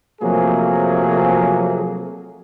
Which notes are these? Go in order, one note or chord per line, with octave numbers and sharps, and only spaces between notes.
C3 F3 F#3 A3 A#3 G#4